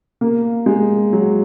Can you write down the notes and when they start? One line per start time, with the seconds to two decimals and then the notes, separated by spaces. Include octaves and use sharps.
0.21 A#3
0.66 G#3
1.13 F#3